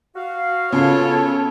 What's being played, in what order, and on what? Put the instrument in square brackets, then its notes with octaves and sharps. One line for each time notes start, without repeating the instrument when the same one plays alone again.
[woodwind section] F#4 F5
[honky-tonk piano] C#3 [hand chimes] B3 F4 A5 [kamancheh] A4 C#5